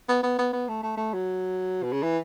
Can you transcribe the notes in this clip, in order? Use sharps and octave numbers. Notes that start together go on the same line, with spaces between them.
B3
B3
B3
B3
A3
A3
A3
F#3
B2
C#3
E3